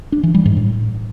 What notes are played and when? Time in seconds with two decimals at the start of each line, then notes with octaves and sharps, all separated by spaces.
0.12 D4
0.23 E3
0.34 G3
0.46 G#2
0.57 A2